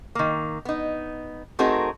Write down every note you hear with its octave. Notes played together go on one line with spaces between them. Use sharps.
D#3 A#3
B3 D#4
A3 C4 D#4 F#4 G#4 A#4